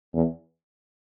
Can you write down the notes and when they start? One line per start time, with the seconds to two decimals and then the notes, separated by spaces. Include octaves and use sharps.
0.14 E2